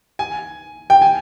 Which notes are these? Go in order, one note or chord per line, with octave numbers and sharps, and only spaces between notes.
G#5
G5
G#5